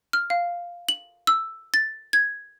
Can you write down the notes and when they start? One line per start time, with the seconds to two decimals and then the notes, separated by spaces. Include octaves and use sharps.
0.13 F6
0.30 F5
0.89 F#7
1.27 E6
1.74 A6
2.13 G#6